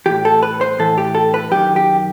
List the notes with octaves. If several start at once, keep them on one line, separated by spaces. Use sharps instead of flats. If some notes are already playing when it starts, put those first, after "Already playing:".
A2 E3 G4
A4
B4
C5
A2 E3 A4
G4
A4
B4
F#2 D#3 G4
G4